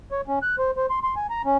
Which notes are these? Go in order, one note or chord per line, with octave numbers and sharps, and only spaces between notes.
C#5
C#4
F#6
C5
C5
C6
C6
G#5
A#5
C#4